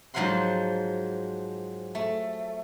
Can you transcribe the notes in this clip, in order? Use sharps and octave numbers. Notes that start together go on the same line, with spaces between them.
G#2 F3 F#3 F5 F#5 C6
A3